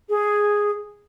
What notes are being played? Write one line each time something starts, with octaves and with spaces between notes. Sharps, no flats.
G#4